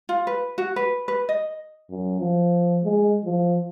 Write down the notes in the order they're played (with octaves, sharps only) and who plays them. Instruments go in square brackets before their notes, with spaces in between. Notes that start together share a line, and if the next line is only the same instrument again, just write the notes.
[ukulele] F4
B4
F#4
B4
B4
D#5
[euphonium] F#2
F3
G#3
F3